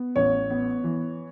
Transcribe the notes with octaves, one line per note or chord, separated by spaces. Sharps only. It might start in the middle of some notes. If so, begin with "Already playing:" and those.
Already playing: B3
A1 C#5
B3
E3